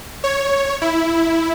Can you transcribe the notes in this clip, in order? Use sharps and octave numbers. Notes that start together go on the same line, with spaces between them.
C#5
E4